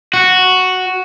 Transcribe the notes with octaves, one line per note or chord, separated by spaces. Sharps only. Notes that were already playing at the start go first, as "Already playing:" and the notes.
F#4